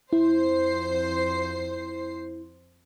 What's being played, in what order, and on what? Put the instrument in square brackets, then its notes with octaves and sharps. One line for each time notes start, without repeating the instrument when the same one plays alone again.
[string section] F2 C5 C7 [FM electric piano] E4